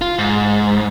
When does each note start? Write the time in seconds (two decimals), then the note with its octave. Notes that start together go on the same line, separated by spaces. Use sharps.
0.01 F4
0.18 G#2